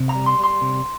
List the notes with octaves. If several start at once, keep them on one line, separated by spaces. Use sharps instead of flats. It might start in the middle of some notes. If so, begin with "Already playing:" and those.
Already playing: C3
A#5
G3
C6
G3 C6
C3